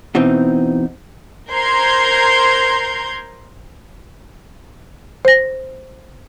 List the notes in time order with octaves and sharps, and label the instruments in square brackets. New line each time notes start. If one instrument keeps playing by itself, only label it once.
[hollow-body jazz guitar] B2 E3 C4 D#4
[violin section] A#4 C5 A#5 C6 G6 G#6
[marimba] C5 A#6